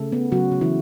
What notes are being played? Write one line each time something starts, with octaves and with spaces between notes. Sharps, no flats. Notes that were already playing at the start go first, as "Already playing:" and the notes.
Already playing: C#3 A3 A4
B3
C#3 F#3 F#4
C#3
E3 E4